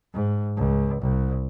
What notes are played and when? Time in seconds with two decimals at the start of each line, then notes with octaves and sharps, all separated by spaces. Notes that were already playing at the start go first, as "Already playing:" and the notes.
0.14 G#2
0.57 C#2
1.02 C2